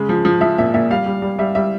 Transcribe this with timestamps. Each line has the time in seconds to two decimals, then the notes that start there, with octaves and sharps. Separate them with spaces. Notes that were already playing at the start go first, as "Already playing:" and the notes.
Already playing: C#3 G#3
0.09 F3
0.25 F3
0.41 F3 E5
0.58 A#2 E5
0.74 A#2 E5
0.90 G3 F5
1.06 G3
1.22 G3
1.39 G3 E5
1.55 G3 E5